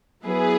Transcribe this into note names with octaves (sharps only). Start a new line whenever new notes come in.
F#3 B3 E4 G#4 B4